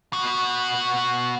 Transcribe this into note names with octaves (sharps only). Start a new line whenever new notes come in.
B2 F#4